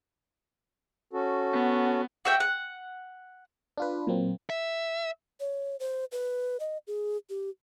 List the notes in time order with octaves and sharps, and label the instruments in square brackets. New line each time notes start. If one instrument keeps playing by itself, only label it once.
[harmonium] C#4 F#4 A4
[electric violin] B3
[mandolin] F#4 E5 G5
F#5
[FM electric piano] D4 F4 B4
A#2 F#3 A#3 C4
[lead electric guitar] E5
[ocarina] C#5
C5
B4
D#5
G#4
G4